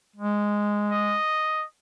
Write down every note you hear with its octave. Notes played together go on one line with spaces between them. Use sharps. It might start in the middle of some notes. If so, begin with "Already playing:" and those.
G#3
D#5